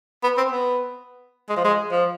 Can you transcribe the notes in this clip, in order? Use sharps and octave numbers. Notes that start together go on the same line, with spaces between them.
B3
C4
B3
G#3
F3
G#3
F3